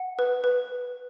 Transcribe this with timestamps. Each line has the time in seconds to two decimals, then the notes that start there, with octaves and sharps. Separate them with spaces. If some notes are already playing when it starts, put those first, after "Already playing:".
Already playing: F#5
0.19 B4
0.44 B4